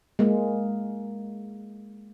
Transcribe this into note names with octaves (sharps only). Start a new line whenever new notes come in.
G#3 A#3